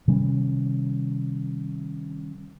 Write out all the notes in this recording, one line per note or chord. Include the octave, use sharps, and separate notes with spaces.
C3 D#3 G3 C#4